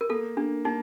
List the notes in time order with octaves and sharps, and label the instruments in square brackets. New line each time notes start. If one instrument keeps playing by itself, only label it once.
[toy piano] A#4
[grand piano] A#3 [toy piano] A4
[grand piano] A#3 [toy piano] D4
[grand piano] A#3 [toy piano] D#4